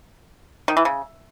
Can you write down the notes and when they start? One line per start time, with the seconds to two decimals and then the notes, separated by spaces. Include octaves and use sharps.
0.68 D#3
0.77 E3
0.85 C#3